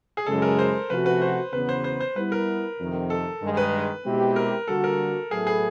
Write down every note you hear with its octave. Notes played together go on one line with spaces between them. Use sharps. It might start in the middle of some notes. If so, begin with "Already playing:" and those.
G#4
F#2 C#3 E3 G#3 A4
A#4
C5
C3 F3 A3 C#4 F#4 B4
B4
C5
E2 C#3 F#3 B3 B4
C5
C5
C5
G3 B3 E4 B4
A#4
F2 C3 D#3
A4
G2 D#3 G#3
B4
B2 G#3 C4 E4 G4
A#4
D3 G3 A#3 D4 F#4 A4
A#4
A2 F#3 B3 E4 G#4 A4
G#4